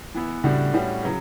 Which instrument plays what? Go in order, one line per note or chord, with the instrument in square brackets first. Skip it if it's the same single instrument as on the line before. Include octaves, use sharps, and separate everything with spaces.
[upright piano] E3 B3 E4
[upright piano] A2 G3 D4 F#4 [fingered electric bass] C#3
[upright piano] A2 G3 C#4 F#4
C#3 F#3